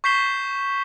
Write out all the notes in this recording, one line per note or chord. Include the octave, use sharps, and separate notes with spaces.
C#6 G6 B6 C7 E7 G7